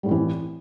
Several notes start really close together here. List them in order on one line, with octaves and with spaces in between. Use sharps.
G3 A2 C4 E3